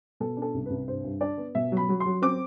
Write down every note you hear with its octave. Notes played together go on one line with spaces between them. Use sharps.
B2 A4
D4
A4
C2
C2 B4
G2 C5
G2
D4 D5
B3
B2 E5
F#3
B5
F#3
C6
F#3
C4 D6